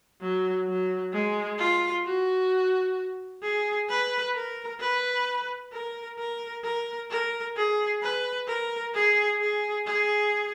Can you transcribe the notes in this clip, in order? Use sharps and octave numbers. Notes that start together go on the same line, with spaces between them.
F#3
F#3
G#3
F4
F#4
G#4
B4
A#4
B4
A#4
A#4
A#4
A#4
G#4
B4
A#4
G#4
G#4
G#4